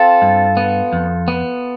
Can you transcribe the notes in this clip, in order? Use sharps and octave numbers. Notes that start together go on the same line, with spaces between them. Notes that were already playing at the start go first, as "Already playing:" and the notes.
Already playing: C4 F4 A4
G2
B3
F2
B3